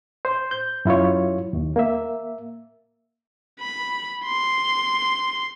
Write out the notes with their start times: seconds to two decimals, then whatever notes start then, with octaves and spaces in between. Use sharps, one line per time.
0.25 C5
0.51 G6
0.85 F#2 E4 F4 C#5
1.53 D#2
1.76 A#3 E5
3.60 B5
4.25 C6